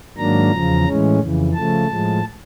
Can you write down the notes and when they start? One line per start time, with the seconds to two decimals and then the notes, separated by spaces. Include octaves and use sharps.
0.17 G#2 D#3 F#3 A#3 D4 A#5
0.51 E2 C#3 F3
0.86 A2 E3 G#3 C#4
1.19 F2 C#3 E3
1.53 C#3 F3 A3 A5
1.88 A2 F3 G#3